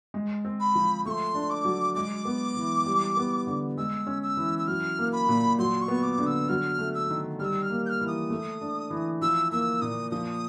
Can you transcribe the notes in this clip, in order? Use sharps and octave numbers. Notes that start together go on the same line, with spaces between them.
G#3
C4
B5
F3
A3 C6 C#6
D4
D6
F#3
G#3 D6
B3
E3
G3
B3
D3
G#3 E6
C#4
E6
E3
E6
F#3 F6
A#3
B5
A#2
F#3 C6
C#6
B3
D6
D3
E6
F#3 F6
A3
E6
D#3
G3 E6 F6
F6
A#3
G6
F6
E3
D#6
A3
D4
E3
F3 E6
A#3 E6
A#2 D#6
F3 D#6